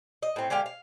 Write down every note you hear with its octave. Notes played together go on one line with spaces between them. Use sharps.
D#5
A2 C4
D3 G#3 G4 F5
F5